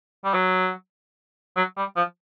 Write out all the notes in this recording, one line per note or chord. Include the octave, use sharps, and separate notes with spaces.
G3
F#3
F#3
G3
F3